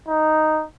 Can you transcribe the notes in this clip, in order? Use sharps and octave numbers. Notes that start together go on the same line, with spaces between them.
D#4